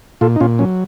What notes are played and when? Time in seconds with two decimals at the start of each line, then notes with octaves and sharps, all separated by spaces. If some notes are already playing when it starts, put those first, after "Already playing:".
0.21 A#2 F4 A4
0.36 D#4
0.40 A#2 C#4 F4
0.59 F#3 C#4